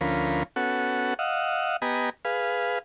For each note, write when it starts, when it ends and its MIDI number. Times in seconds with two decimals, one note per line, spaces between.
0.01 0.43 38
0.01 0.43 53
0.01 0.43 61
0.01 0.43 70
0.01 0.43 83
0.56 1.14 59
0.56 1.14 61
0.56 1.14 66
0.56 1.14 69
0.56 1.14 78
1.19 1.77 75
1.19 1.77 77
1.19 1.77 78
1.19 1.77 88
1.82 2.10 59
1.82 2.10 67
1.82 2.10 75
1.82 2.10 80
1.82 2.10 82
1.82 2.10 83
2.25 2.79 68
2.25 2.79 71
2.25 2.79 77